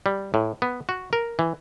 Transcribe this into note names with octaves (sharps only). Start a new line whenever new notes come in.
G3
A2
B3
F#4
A#4
E3